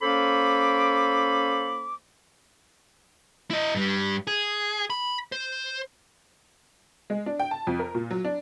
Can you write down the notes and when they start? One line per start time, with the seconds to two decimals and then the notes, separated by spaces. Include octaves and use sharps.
0.02 A#3 C#4 A4 C5 B5 D6
3.50 E4 D#5
3.75 G2 G3
4.27 G#4
4.90 B5
5.32 C5
7.10 G#3
7.26 D4
7.39 G5
7.51 A5
7.67 F2
7.79 A#4
7.94 A#2
8.10 F#3
8.25 D4